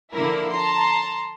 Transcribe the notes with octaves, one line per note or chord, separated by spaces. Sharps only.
D3 F3 A#3 E4 A#4
A5 A#5 C6